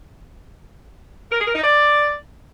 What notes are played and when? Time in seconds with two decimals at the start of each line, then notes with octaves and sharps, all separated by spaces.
1.31 A#4
1.39 G#4
1.47 A#4
1.54 D#4
1.62 D5